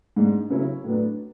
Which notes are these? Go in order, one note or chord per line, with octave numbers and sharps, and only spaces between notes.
G#2 G#3 D4
C#3 F#3 C#4 E4
A2 F#3 B3 D4